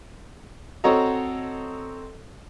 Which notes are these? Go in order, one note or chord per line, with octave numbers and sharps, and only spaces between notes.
C4 F#4 A4 C#5 D#5 A#5